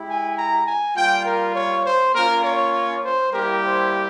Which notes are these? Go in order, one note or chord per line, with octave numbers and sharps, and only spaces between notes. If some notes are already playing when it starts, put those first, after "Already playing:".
Already playing: G#3 E4 G4
G#5
A#5
G#5
G3 A#3 F4 G5
A#4
C#5
C5
A#3 C#4 F4 A#4
C#5
C5
G3 A#3 E4 G4 A#4
C5